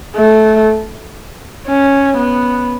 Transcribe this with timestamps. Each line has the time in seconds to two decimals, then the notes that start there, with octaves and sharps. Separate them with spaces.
0.15 A3
1.67 C#4
2.17 B3